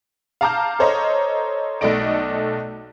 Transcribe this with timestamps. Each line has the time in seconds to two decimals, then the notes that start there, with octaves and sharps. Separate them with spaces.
0.41 F5 A5 A#5 D6 F6 G6
0.79 A4 C5 C#5 D#5 A#5
1.81 B1 A3 A4 D5 D#5 D7